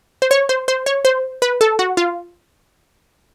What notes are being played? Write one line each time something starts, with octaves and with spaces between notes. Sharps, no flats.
C5
C#5
C5
C5
C#5
C5
B4
A4
F#4
F4